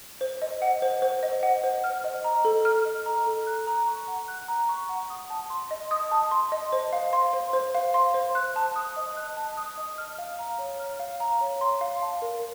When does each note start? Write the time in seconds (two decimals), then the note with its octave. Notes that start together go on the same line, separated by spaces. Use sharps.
0.21 C5
0.42 D#5
0.62 F#5
0.82 C5
1.02 C5
1.23 D#5
1.43 F#5
1.64 C5
1.84 F6
2.04 D#5
2.24 A#5
2.45 A4
2.65 F6
2.85 D#5
3.06 A#5
3.27 A4
3.47 F#6
3.67 A#5
3.87 C#6
4.08 F#5
4.28 F#6
4.48 A#5
4.69 C#6
4.89 F#5
5.10 D#6
5.30 A5
5.50 C6
5.71 D#5
5.91 D#6
6.11 A5
6.31 C6
6.52 D#5
6.72 C5
6.93 F5
7.13 C6
7.33 C5
7.53 C5
7.75 F5
7.94 C6
8.14 C5
8.35 F#6
8.56 A5
8.76 D#6
8.97 D#5
9.17 F#6
9.37 A5
9.57 D#6
9.78 D#5
9.98 F6
10.18 F5
10.39 A#5
10.59 C#5
10.80 F6
11.00 F5
11.20 A#5
11.41 C#5
11.61 C6
11.81 F5
12.02 A5
12.22 A#4